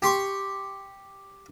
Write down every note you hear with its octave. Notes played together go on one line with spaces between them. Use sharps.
G4 C6 C#6